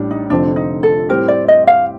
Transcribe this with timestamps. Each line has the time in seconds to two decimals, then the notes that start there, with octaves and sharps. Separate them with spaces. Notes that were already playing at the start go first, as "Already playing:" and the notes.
Already playing: A1 A2 G3 D4
0.11 D#4
0.30 F1 F2 D3 F3 C4 D4
0.56 D#4
0.83 A4
1.09 A2 G3 C4 G4 A#4
1.28 D5
1.48 D#5
1.67 F5